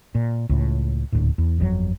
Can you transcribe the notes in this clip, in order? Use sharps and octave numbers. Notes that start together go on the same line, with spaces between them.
A#2
C#2 A2
D#1 D2 A2
E2
G1 F2 D3 F#3